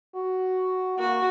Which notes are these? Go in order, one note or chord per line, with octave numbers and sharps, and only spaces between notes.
F#4
A#3 F#4